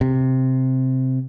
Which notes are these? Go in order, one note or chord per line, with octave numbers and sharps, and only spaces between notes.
C3